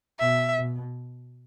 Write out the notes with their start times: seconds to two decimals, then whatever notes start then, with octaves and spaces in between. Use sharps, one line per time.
0.20 B2 E5
0.57 B2